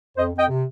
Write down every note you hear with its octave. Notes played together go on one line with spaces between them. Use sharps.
F2 C5 D#5
F2
D#5 G5
C3